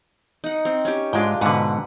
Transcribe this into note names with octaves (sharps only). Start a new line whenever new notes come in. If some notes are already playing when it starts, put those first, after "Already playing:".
D#4 F#5
C4
C#4 G4
G#2 G#3 D4 F4 G5
G#2 B2 D3 B4 F#5